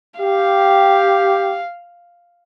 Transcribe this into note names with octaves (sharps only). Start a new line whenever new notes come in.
G4 F5